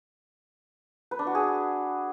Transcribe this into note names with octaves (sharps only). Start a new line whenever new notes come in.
B4
D4
F#4
G#4